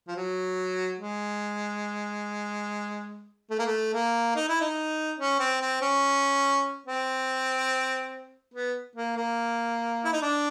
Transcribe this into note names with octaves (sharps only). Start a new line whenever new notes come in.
F3
F#3
G#3
A3
A#3
A3
A#3
D#4
E4
D#4
C#4
C4
C4
C#4
C4
B3
A#3
A#3
E4
D#4
D4